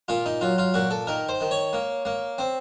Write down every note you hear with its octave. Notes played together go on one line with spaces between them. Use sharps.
A#2 F4
D#4
F#3 F4
F4
A#2 F#4
A4
D#3 A#4
C5
D#3
C#5
A#3
A#3
C4